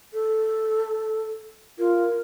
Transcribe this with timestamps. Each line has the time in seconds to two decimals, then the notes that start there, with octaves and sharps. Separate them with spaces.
0.13 A4
1.79 F4 A#4